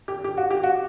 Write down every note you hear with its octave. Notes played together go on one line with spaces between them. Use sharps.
G4
G4
F#4
G4
F#4